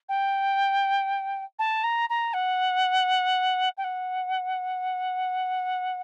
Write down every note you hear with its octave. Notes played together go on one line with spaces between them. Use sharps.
G5
A5
A#5
A#5
F#5
G5
F#5